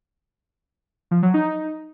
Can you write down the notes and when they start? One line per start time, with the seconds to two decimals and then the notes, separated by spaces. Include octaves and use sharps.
1.11 F3
1.22 F#3
1.34 D#4